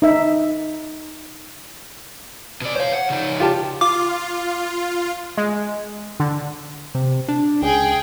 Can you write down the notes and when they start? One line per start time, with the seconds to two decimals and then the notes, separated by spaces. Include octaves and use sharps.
0.02 D#4 E5
2.61 B2 D5
2.75 C5 C#5 F5
2.93 F#5
3.10 C#3 D#4
3.40 F4 G4 A5
3.81 F4 D6
5.37 G#3
6.20 D3
6.95 C3
7.29 D4
7.62 C#2 G#4 G5